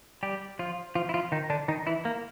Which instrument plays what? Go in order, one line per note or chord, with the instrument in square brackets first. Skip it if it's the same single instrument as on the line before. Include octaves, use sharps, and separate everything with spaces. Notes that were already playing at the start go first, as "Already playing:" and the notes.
[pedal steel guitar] G3 G4
F3 F4
F3 F4
E4
F3 F4
D#3 D#4
D3 D4
D#3 D#4
E3 E4
A#3